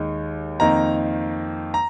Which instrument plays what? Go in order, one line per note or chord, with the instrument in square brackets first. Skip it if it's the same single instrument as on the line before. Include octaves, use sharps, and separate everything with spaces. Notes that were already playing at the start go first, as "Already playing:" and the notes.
Already playing: [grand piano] D#2 D#3 G#3 D#4
F2 D#3 A#3 D#4 A#5
A#5